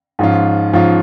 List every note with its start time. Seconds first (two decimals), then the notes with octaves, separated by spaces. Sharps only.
0.19 G#2 F3 C#4 F4
0.73 G#2 F3 C#4 F4